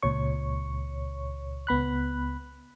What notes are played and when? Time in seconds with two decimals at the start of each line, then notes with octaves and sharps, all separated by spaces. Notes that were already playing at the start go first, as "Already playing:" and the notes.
0.03 C#2 A#2 C#5 C#6
1.67 C#2 B3 B5 F#6